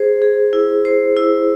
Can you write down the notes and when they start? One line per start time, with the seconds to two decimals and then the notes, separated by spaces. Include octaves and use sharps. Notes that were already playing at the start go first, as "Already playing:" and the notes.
Already playing: G#4 C5
0.22 G#4
0.53 E4
0.85 C5
1.17 E4